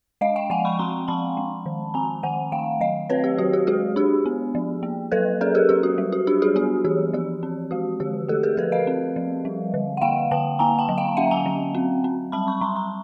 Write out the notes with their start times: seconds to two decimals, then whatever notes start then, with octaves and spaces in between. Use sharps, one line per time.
0.21 G#3 D#5 F5
0.36 F5 G5
0.50 F3 F#5 G#5
0.65 B5 C#6
0.79 C4 A#5 C6
1.08 F3 A5 B5
1.37 G#3
1.66 D#3
1.94 C4 G#5 A#5
2.23 D#3 F#5 G#5
2.52 A3 F5 G5
2.81 F#3 D#5 F5
3.10 C4 B4 C#5
3.24 G4
3.38 F#3 F#4
3.53 G4
3.67 G#3 F#4 G#4
3.96 D4 G4
4.26 B3
4.55 F3
4.83 A#3
5.12 F#3 A4 B4
5.41 C#4 G#4 A#4
5.55 G4 A4
5.69 F#3 G4
5.83 F#4
5.98 G3
6.12 F#4
6.27 D4 G4
6.42 F#4 G#4
6.56 B3 F#4 G#4
6.84 E3 G4
7.13 F3 G4
7.43 C4
7.71 G#3 F#4
8.00 D3 G4
8.28 A3 G4 A4
8.43 G#4 A#4
8.57 F3 A4 B4
8.72 D#5 F5
8.87 C4
9.16 F3
9.45 G3
9.74 D3
9.97 F#5
10.01 A#3 F5 G5
10.31 D3 G5 A5
10.59 A#3 G#5 A#5
10.79 G5 A5
10.89 F#3
10.98 F5 G5
11.17 C#4 E5 F#5
11.31 G#5 A#5
11.46 F#3
11.75 C4
12.04 C4
12.32 G3 A5 B5
12.47 B5 C#6
12.61 G3 A#5 C6
12.76 A#5 C6